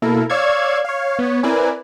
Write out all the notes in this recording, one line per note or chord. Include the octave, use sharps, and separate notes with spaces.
B2 A#3 E4 A4 A#4
C#5 D5 F5 C#6 E6 G#6
C#5 F5
B3 C#5
C4 E4 A#4 B4 D5 G#5